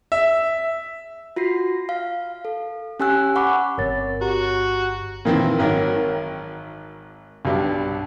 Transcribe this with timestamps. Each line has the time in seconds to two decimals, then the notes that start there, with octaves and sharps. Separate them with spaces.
0.12 E5
1.36 F4 F#4 A#6 C7
1.89 F5
2.45 A4
3.00 C#4 G4 G#5 E6 F#6
3.36 F#5 B5 C#6 D6
3.78 G1 C#3 C4 A#4 C#5 A6
4.21 F#4 G4 A#5
5.25 A#2 D#3 E3 C4
5.59 G#1 D#3 F#3 A#4
7.45 B1 G2